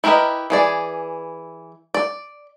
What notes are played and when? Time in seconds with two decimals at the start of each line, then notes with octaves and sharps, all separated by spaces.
0.04 E4 G4 A#4 B4 D#5
0.50 E3 G#4 D5
1.94 D5